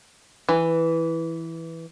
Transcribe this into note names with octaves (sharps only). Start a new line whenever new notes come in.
E3